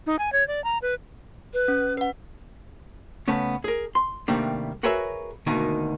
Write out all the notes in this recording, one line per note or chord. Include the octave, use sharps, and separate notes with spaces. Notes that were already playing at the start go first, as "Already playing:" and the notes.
D#4
G#5
C#5
D5
A#5
B4
B4
C#4
B4 F#5
C#3 A3 B3 C#4
G#4 A#4
C6
C3 D#3 G3 A3 A#3 D4
F#4 G#4 A#4 B4 C#5 E5
D2 B2 D#3 A#3 D#4